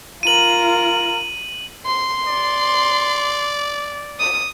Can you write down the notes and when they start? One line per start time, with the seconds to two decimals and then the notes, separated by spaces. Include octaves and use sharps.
0.23 F4 A#4 D#7 F#7
1.86 C6
2.28 D5
4.20 D#6